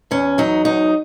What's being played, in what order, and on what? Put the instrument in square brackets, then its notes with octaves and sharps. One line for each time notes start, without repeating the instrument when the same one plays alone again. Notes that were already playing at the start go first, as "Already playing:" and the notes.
[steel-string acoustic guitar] E2 C#4
F#3 D#4
E2 D#4